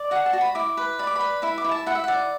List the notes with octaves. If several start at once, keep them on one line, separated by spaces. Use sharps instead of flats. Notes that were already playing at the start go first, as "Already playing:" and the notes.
Already playing: D5
F#4 F#5
A5
F#4
B5
E4 D6
B4
D5 B5
D6
B5
B4
E4 B5
D6
E4
A5
E4 F#5
E5
D5 F#5